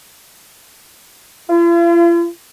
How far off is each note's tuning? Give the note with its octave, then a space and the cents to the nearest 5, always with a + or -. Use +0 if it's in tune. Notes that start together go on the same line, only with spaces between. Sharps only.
F4 -45